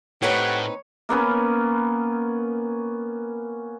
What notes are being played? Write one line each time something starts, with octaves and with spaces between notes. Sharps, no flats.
A2 C4 D#4 G4 B4 C#5 F#5
A#3 B3 C#4 B4